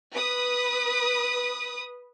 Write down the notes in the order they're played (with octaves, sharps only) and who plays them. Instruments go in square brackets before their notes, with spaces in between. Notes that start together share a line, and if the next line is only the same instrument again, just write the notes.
[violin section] B4 D#6